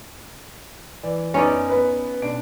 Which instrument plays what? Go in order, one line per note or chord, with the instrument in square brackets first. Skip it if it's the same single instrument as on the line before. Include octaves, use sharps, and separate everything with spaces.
[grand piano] E3 D5
[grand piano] F#2 B3 [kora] C#4 D#4 D5
[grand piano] B3 B4
B1 D4 D7